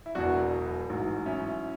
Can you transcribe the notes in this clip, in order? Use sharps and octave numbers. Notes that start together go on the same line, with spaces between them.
E4
E1 E2 B2 F#3 D4 F#4
A1 G#2 F#3
C#4 E4